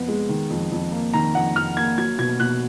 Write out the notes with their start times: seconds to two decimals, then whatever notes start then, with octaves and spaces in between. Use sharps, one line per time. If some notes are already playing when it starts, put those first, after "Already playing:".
Already playing: F2 B3
0.08 G#3
0.29 D#3
0.50 F2
0.71 F2
0.92 A#3
1.14 D#3 A#5
1.35 F2 F#5
1.56 F2 F6
1.77 A#3 G#6
1.98 F#3 G#6
2.18 B2 G#6
2.40 B2 F#6